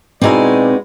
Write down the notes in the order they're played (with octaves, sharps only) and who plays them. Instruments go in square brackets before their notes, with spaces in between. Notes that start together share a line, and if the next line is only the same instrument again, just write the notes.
[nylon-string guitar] B2 E4 [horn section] G#3 F#4 D5 [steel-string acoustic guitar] C4 D#4 G#5